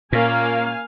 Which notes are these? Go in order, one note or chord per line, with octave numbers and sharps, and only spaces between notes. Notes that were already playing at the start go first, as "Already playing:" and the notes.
A#2 A#3 C#4 F4 F5 G#5